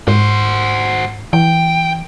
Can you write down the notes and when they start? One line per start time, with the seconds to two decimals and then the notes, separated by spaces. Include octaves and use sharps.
0.08 G#2 F#4 C5
1.33 E3 G5